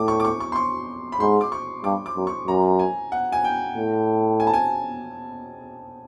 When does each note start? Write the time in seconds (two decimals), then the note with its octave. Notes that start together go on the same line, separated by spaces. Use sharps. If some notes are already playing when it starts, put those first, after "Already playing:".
Already playing: A2 D6
0.08 C#6
0.20 D6
0.25 C#6
0.40 C#6
0.52 C6
0.56 C#6
1.12 B5
1.20 G#2 C6
1.41 D6
1.52 C#6
1.84 G2 D6
2.06 D6
2.16 F#2
2.27 C#6
2.47 F#2 A#5
2.79 G#5
3.12 F#5
3.32 G#5
3.44 G5
3.76 A2
4.40 G#5
4.47 A5
4.54 G#5